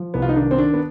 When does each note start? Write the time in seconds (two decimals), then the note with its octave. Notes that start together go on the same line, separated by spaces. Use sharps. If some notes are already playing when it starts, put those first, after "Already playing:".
Already playing: F3
0.14 C2 B3
0.22 F4
0.29 D#4
0.36 D#3 D4
0.51 C4
0.57 D#3 D4
0.73 B3